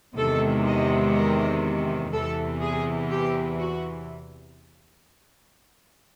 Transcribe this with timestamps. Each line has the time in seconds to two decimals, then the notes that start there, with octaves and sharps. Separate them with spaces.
0.17 E2 C3 D#3 G#3 A4
0.66 D#5
1.15 A#4
2.13 E2 C3 E3 A4
2.62 G#4
3.11 G4
3.59 F#4